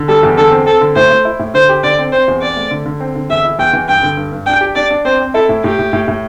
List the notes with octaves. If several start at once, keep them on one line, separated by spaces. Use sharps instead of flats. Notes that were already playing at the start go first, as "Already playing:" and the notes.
Already playing: D3
G3 A4
E2
D3 A4
C4
C4 A4
D3
A2 C5
A3
E4
A2
D3 C5
G4
D3 D5
C4
C4 C5
E2
C4 D5
A3
D3
D3
C4
D3
E2 E5
E4
E2 G5
E3
G2 G5
D3
G2
G2
D4 G5
G4
D4 D5
D4
C4 C5
C4
E4 A4
A2
A2 G4
A2
A2
A2